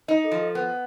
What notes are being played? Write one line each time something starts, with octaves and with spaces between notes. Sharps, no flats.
D#4 D#5
A4
F3
A4
B3